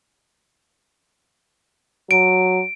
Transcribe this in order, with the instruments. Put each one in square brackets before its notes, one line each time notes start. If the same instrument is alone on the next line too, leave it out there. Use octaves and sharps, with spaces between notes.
[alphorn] F#3 [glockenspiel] D7